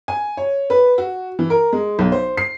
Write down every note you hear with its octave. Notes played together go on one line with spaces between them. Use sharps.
G#5
C#5
B4
F#4
E3
A#4
G#3
B1
C5
C7